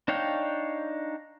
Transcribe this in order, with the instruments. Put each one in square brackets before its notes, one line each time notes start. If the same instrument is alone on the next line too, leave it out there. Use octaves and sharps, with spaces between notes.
[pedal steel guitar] D4 D#4 C#5 F5 G5